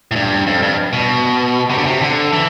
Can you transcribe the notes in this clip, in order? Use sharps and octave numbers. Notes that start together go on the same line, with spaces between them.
A2
G2
F2
G2
B2
C3
D3
C3
D3
E3